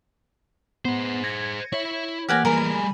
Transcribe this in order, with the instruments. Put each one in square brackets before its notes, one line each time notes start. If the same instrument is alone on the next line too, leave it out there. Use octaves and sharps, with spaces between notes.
[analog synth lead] B3 [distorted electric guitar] G#4 C5
[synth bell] G#6 A#6 [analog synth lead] C#7
[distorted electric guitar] E4 E5 [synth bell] C#5
[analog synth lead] E3 [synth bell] A#3 F6 [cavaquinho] G4 F#5 G#5
[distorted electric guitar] G3 G#4 [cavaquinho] A#4 [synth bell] G#5 B5